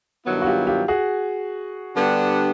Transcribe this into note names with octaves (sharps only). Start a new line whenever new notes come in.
G2 D#3 F#3 B3 E4
F#4
F4 G4
F4 G4
F#4 G#4
D3 G3 B3 D4 G4